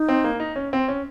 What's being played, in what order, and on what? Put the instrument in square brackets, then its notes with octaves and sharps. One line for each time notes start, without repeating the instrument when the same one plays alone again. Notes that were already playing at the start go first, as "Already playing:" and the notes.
Already playing: [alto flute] D#4
[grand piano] C4
A#3
D#4
C#4
C4
C#4